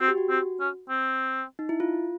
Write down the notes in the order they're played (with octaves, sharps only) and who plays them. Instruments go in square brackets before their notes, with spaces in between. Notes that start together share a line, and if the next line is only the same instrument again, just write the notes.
[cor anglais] C4 [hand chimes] F#4
[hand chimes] G4
F#4
[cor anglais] C4
C#4
C4
[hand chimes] D#4
E4
F4